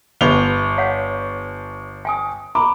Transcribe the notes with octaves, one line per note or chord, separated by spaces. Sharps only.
G1 F7 G7
C#5 F5 F#5
G5 G#5 D#6
A#5 B5 D6